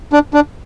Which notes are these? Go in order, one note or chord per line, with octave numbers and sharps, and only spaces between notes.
D4
D4